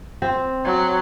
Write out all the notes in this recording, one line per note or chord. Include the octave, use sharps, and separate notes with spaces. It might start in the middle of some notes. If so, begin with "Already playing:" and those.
C4
F#3